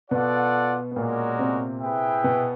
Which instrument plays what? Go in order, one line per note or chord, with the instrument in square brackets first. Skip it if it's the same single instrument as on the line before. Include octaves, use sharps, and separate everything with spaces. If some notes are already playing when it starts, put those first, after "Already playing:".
[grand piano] B2 B3 [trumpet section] F4 A4 D5 F#5
[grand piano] B3
[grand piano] A#2 A#3 [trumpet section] G#3 C#4 F#4 A#4 D5
[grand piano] C3 C4
[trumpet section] E4 G#4 B4 E5 G5
[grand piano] B2 B3